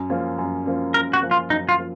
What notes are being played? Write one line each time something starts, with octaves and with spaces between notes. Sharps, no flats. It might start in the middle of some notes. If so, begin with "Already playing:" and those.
Already playing: F#2
F3 A#3 C#4
F#2
F3 A#3 C#4
F#2 A#4
F#4
F3 A#3 C#4
F4
F#2 D#4
F4
F3 A#3